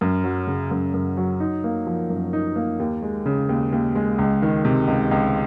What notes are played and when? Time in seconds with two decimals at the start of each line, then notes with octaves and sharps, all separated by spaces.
0.01 F#2
0.24 F#3
0.47 C#3
0.71 F#2
0.94 F#2
1.17 F#3
1.40 D#4
1.64 A#3
1.87 F3
2.10 F#2
2.33 D#4
2.56 A#3
2.80 D#2
3.02 G#3
3.26 C#3
3.49 D#2
3.72 D#2
3.95 G#3
4.19 C#2
4.42 D#3
4.65 C3
4.88 C#2
5.11 C#2